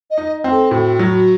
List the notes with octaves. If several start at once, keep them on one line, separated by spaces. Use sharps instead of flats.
D#5
D#4
C4
A4
A2 F#4
F#3